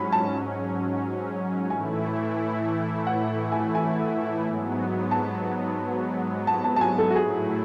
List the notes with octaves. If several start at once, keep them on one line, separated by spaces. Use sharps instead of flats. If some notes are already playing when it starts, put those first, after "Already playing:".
Already playing: G#2 F#3 C#4 G#5 B5
A5
A2 E3 A3 E4 G#5
F#5
G#5
G#5
G#2 F#3 B3
A5
A5
A5
A5
G#5
A4
F#4
A2 F#3 A3 E4 G#4